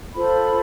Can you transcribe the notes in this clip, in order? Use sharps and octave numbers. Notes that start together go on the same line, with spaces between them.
F4 A4 C5 B5